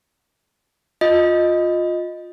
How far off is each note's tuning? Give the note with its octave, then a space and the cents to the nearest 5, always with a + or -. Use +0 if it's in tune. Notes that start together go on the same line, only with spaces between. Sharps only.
F4 +20 D#5 +0